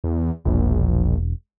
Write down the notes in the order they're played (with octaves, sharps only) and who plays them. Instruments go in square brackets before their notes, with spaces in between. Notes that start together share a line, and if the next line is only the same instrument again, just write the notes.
[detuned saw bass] E2
[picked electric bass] E1 [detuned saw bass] A#1